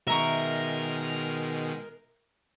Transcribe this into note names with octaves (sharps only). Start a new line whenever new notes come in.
B2 D#3 G#3 A#4 E5 A#5 C#6